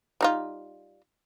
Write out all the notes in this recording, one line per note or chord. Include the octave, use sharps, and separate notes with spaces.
G3 D#4 F4